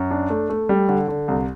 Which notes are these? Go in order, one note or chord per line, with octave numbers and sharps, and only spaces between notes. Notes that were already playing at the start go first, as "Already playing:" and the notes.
Already playing: F#2
D4
A3
A3
G3
D3
D3
C2